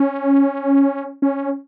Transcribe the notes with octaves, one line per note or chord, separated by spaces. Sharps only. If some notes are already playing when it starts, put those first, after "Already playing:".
Already playing: C#4
C#4